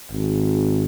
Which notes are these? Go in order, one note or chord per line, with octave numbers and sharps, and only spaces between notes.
G#1